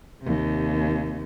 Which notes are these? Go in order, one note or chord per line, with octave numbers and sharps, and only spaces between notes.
D#2 C3